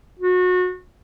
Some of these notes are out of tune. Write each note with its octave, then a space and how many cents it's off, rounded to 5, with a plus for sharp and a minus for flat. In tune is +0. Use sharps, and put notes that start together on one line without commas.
F#4 -30